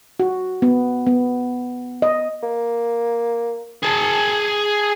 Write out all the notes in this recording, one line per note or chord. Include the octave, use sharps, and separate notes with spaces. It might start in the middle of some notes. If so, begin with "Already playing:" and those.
F#4
B3
B3
D#5
A#3
G#4 A5